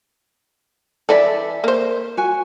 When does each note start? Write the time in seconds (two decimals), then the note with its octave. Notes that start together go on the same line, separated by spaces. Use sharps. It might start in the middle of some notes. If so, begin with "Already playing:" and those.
1.09 E3 A4 D5 E5
1.64 A#3 C5
2.17 F#4 G#5